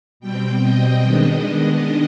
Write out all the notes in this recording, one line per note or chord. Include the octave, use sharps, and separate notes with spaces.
B2 G3 C4 G5
D#5
D#3 G#3 B3 D4